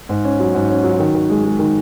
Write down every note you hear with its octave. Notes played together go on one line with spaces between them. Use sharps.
G#2
C#4
F#3
G#2
C#4
F#3
D#3
D#3
G#3
G#3
D#3